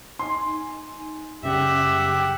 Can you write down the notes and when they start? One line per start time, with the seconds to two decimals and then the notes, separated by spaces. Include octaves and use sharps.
0.19 D#4 G#5 C6
1.43 F#2 C#3 G3 G4 E5 F#5